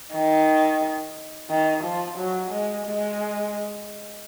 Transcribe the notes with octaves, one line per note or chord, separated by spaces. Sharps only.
D#3
D#3
F3
F#3
G#3
G#3